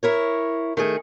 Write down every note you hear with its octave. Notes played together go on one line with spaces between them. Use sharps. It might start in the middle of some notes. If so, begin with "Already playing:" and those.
E4 A#4 C#5
D#3 A3 G#4